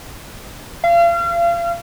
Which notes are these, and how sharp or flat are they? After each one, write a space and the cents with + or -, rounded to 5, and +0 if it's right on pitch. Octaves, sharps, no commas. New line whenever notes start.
F5 -35